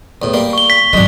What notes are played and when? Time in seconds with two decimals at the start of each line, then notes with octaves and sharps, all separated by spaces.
0.22 E2 A2
0.34 G3 A#3 C6
0.53 C#6 G7
0.70 B6
0.93 G#1 F#3 G#3 D4